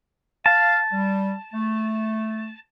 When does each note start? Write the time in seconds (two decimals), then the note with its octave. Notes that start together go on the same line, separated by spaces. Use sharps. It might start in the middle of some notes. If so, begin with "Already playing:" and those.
0.46 F5 A5
0.92 G3
1.53 A3